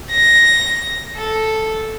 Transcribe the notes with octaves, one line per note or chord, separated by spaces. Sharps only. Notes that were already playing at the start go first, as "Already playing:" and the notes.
A#6
A4